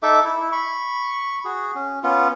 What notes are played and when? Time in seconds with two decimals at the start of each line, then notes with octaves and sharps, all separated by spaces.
0.03 D#4 A4 E5 D6
0.25 E4
0.52 B5 C#6
1.45 F#4 G#4
1.75 C#4
2.03 B3 C#4 F4